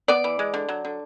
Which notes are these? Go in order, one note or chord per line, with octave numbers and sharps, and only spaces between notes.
B3 D5
E3
G#3
D3
F#3
D3